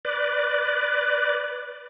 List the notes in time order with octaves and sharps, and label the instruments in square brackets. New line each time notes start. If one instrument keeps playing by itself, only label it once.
[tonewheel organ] B4 D5